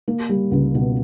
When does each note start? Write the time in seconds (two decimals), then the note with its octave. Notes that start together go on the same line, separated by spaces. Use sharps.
0.08 A#3
0.29 G3
0.51 C#2
0.75 B2